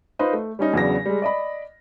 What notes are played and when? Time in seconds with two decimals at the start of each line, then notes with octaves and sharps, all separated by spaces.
0.19 D#4 F4 B4 C5 D#5
0.33 A3
0.59 G3 C#4 D#4
0.73 E2 C#3 F#3 B3 D4 A#6
1.06 G3 G#3
1.22 D5 D#5 B5